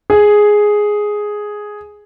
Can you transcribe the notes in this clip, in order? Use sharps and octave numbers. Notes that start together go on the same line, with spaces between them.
G#4